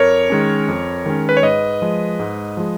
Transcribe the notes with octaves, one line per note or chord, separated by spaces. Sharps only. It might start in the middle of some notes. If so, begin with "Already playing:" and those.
Already playing: F2 A#4 C#5
D#3 G#3 C#4
F2
D#3 G#3 C#4
B4
C#5
G#2 B4 D#5
F3 G#3
G#2
F3 G#3